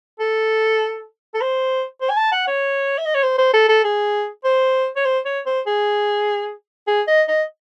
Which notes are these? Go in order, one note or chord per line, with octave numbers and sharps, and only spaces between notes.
A4
A4
C5
C5
G#5
A5
F#5
C#5
E5
D#5
C#5
C5
C5
A4
A4
G#4
C5
C#5
C5
C#5
C5
G#4
G#4
D#5
D#5